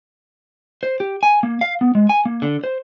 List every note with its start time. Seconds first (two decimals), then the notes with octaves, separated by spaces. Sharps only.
0.83 C5
1.00 G4
1.23 G#5
1.43 A#3
1.61 F5
1.81 B3
1.95 G#3
2.09 G#5
2.25 A#3
2.42 D3
2.64 C5